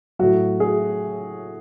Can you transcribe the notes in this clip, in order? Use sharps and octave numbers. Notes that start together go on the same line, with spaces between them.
A2 F#3 F#4
G#4